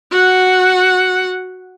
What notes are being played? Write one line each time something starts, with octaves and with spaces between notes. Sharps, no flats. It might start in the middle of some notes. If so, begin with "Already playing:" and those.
F#4 F#5